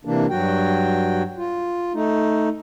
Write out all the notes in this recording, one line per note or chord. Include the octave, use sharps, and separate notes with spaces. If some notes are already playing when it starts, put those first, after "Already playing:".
C3 E3 A#3 D4
G2 F#3 F#4 G5
F4
A3 D#4